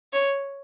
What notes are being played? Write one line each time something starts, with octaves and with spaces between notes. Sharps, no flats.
C#5